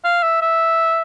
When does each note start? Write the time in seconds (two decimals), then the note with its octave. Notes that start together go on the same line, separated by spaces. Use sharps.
0.04 F5
0.22 E5
0.42 E5